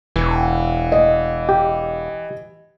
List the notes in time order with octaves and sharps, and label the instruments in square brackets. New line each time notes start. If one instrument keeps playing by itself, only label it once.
[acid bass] E1 [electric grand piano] E3
[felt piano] D#5
[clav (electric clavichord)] G4